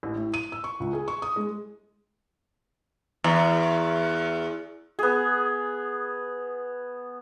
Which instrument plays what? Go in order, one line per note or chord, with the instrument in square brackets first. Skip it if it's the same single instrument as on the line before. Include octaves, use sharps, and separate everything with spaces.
[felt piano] A1
A2
D#7
E6
C#6
C#2
G#4
C#6
D#6
G#3
[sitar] E2
[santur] B3 G#4